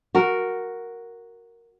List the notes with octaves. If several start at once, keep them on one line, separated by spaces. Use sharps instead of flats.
F#4 A#4